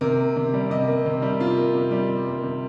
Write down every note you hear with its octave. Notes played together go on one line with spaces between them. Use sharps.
C3 A#4
A#3
C3
G3
C3 D#5
A#3
C3
G3
C3 F4
A#3
C3
G3
C3
A#3
C3